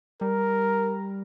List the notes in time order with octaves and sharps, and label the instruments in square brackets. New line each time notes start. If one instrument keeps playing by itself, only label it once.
[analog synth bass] G3 [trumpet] A#4